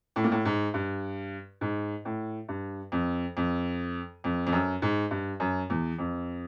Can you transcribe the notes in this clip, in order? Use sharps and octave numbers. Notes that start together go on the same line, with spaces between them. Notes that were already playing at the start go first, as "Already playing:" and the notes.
A2
A#2
A2
G#2
G2
G#2
A2
G2
F2
F2
F2
F2
F#2
G#2
G2
F#2
E2
F2